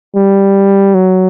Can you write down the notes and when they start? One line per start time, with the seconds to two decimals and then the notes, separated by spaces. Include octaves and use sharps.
0.15 G3
0.94 F#3